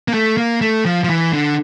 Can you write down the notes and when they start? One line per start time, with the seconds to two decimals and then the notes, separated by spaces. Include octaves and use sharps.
0.08 A#3
0.14 A3
0.37 A#3
0.61 A3
0.85 F3
1.04 F3
1.10 E3
1.33 D3